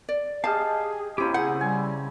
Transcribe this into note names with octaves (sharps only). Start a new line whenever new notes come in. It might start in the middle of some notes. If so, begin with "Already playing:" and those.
D5
G4 G#4 D#5 F5 A5 A#5 F6
A#3 C4 C#4 E4 G4
C#3 G#4 F#5 G6
G3 G#5